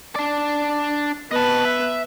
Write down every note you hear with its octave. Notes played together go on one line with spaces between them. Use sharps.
D4 D5
B3 B4 D#5 A5
E5